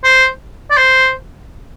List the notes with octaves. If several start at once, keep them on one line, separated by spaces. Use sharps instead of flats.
C5
D5
C5